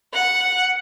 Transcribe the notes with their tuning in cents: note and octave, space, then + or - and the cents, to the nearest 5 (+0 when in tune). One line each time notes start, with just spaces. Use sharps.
F#5 -5